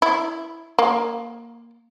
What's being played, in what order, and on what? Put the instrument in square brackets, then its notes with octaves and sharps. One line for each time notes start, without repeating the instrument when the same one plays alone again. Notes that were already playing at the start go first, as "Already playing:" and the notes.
[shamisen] E4
A#3